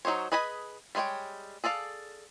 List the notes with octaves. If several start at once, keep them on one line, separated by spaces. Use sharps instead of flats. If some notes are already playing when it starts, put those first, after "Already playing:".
F#3 D#4 C5 C#5
G#4 B4 D#5 G#5 B5
G3 G#3 G#4 C#5 G5
G#4 A4 D5 F5